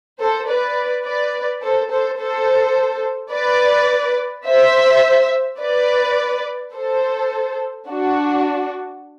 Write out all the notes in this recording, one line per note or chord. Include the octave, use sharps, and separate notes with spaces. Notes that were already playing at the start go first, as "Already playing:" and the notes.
A4 C5
B4 D5
B4 D5
A4 C5
A4 C5
A4 C5
B4 D5
C5 E5
B4 D5
A4 C5
D4 F#4